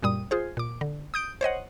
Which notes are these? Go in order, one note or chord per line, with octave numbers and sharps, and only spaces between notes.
F#2 A#2 G3 D#6
F4 G#4 C5
A#2 D6
D3
D#6 G6 D7
C5 C#5 D#5 F#5